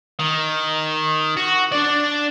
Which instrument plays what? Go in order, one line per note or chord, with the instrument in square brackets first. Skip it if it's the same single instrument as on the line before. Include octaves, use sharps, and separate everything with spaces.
[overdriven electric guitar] D#3
F#4
D4 D5